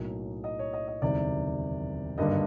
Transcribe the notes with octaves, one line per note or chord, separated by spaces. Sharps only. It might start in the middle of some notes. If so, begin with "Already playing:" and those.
Already playing: B1 A2 F#3 A#3 D#5
D#5
C#5
D#5
D#5
E1 D2 C3 D#3 G3 D5
G#1 G2 D3 G3 A#3 D#5